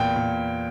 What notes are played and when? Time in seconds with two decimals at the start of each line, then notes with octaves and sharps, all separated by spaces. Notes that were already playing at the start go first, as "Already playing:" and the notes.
Already playing: E2 A#2 G5
0.16 A#2